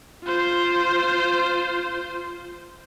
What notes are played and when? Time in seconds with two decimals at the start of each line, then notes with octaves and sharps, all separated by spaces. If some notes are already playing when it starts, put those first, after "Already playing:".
0.24 F4 C5